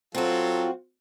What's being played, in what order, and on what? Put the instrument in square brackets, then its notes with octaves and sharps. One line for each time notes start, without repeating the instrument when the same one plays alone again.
[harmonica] F#3 A4 [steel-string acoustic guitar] C4 F#4 [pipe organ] F4